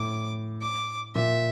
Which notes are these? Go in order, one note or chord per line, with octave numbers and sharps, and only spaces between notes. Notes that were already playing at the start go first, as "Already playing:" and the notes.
Already playing: A2 D6
D6
A#2 E5